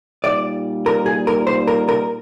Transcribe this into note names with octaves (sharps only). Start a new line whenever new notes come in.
A#2 G3 A#3 D#4 D5
A#4
G#4
A#4
C5
A#4
A#4